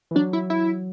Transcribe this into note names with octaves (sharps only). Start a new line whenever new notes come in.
E3
F#3 D4
E4
E4